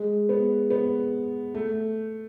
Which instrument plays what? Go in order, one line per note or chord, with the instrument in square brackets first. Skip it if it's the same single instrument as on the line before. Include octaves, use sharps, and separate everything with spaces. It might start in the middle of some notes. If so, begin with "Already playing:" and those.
Already playing: [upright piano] G#3
B3
B3
A3